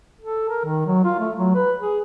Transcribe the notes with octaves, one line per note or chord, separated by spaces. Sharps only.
A4
A#4
D#3
F#3
F4
A3
F#3
B4
G#4